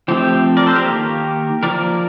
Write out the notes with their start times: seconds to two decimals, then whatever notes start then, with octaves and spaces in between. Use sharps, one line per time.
0.08 F3 A3 C4 G4
0.57 A#4 D5
0.66 A4 C5
0.76 G4 A#4
0.86 D#3 A#3
1.63 F3 A#3 A#4 D5